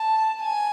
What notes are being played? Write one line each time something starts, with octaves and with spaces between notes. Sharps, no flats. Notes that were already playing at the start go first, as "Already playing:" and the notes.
Already playing: A5
G#5